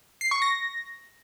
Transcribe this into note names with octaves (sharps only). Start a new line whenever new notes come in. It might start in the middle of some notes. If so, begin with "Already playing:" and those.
C7
C#6
A#6